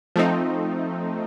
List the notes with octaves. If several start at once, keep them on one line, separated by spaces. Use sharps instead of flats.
F3 A3 C4 D#4